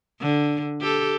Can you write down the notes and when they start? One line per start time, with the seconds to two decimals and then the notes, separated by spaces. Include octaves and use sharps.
0.21 D3
0.82 G4 A4